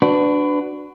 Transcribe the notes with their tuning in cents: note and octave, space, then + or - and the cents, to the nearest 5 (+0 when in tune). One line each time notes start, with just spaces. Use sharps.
D4 +0 F#4 +0 B4 +25